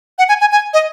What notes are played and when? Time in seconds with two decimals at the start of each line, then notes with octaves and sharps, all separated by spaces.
0.19 F#5
0.29 G#5
0.41 G#5
0.52 G#5
0.74 D#5